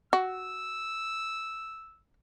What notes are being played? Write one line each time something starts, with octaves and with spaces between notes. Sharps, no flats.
F#4 E6